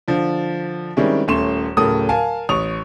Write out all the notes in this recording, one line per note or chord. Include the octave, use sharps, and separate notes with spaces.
D3 F3
D#3 G3 G#3 C4 C#4 E4
D#1 A3 C#4 C6 E7
D1 A2 C#3 A4 A#4 D#6
A#4 F5 G#5 A5
A1 C#6 D#6 F7